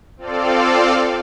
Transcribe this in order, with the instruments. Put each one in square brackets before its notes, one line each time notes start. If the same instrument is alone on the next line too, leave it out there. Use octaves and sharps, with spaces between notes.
[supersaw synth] C4 F4 A4 D5 F5